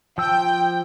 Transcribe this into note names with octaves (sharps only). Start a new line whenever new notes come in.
F3 G5 E6